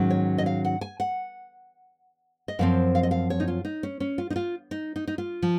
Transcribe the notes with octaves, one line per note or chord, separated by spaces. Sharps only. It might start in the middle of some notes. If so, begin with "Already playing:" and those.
Already playing: G#2 D#3 F#3 C#4
C#5
D#5
F5
F#5
G#5
F#5
D#5
F#2 F3 C4 F5
F5
D#5
F5
C#5
D#4
F4
D#4
C#4
C#4
F4
D#4
F4
D#4
D#4
D#4
F4
F3